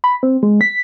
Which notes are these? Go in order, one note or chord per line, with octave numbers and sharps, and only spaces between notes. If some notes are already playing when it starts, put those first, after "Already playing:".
B5
C4
G#3
B6